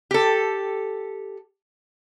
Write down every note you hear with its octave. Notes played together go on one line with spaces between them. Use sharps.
G4 A4